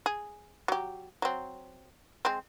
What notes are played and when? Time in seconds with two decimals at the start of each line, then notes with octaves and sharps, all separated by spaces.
0.06 G#4
0.68 F#3 G4
1.22 F#3 C4
2.25 G#3 C4